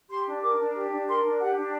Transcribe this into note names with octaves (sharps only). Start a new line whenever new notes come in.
G4 C6
D4
A#4 D6
D4
G4
D4
A#4 C6
D4
G4 F#5
D4